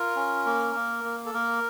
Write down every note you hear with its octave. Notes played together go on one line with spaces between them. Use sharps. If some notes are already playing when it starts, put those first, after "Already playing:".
Already playing: F4 A#4
C#4
A#3
A#3
A#3
A4
A#3 A#4